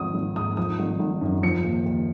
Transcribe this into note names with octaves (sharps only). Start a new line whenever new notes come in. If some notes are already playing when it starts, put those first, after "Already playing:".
Already playing: G#1 F3 D#6
G#1
G#2 D#6
F3 D#6
G#1
G#1
F#2
F3 C#7
D#2
D#2